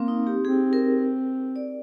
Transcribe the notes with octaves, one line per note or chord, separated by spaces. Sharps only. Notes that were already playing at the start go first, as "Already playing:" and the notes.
Already playing: A#3 C4
D#4
G4
C4 G#4
A#4
D5